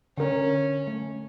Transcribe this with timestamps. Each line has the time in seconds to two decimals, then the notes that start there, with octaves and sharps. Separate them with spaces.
0.18 D3 C#4 A#4
0.87 A3